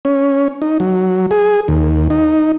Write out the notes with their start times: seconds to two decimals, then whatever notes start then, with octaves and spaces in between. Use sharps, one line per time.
0.05 C#4
0.62 D#4
0.80 F#3
1.31 G#4
1.68 D#2
2.10 D#4